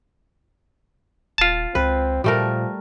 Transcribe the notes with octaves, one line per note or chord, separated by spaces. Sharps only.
D#1 F4 A5
C#2 C4 B4
A#2 F3 G3 A3 A#4